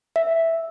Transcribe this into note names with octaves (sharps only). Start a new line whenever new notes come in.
E5